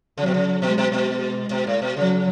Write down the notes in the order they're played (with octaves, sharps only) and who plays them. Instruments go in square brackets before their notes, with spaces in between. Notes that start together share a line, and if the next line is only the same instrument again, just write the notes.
[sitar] C#3 [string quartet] F#3
[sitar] B2
C#3
[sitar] B2 [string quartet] G#3
[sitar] B2
B2
[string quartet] G#3
[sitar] B2
A2
B2
[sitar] C#3 [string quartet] F#3